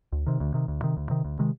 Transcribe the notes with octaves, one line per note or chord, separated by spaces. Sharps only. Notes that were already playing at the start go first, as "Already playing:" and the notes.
D2
C3 D#3
D2
C3 D#3
D2
C3 D#3
D2
C3 D#3
D2
C3 D#3 G#3